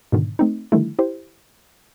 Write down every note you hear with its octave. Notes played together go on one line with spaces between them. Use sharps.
G#2 B2 D3 D#3
A3 C4 D#4
D3 D#3 F3 G3 A3 E4
E4 G4 C5